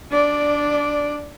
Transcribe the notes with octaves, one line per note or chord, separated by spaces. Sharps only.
D4 D5